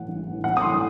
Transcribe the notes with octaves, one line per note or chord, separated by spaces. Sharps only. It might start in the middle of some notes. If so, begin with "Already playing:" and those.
Already playing: A2 E3 F#5
A1
A2
E3
B1 F#5
D#6
A2 E3 C6